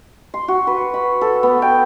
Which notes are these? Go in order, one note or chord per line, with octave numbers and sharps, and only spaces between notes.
C6
F#4
B4
B5
A4
B3
G5